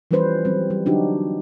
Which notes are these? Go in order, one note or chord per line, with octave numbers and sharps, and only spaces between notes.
E3 F3 G3 C#4 B4 C5
E3 F#3 G3 C4 C#4
G3
D3 F#3 D4 D#4 F#4 G4